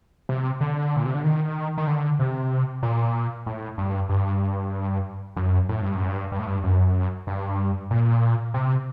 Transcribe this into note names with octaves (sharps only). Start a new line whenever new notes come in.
C3
D3
A#2
C3
D3
D#3
D#3
D3
C3
A#2
A2
G2
G2
F#2
A2
G2
F#2
G2
G2
A2
G2
F#2
G2
A#2
C3